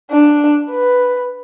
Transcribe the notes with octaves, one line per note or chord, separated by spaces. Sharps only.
D4
B4